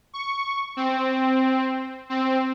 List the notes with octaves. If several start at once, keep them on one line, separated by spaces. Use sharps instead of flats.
C#6
C4
C4